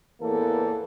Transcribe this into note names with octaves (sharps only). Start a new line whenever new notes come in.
E2 A2 E3 A#3 B3 A4